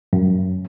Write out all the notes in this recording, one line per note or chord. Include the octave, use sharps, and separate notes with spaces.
F#2